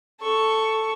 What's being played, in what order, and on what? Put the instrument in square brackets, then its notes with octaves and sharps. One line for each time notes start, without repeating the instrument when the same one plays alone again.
[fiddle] A4 C#6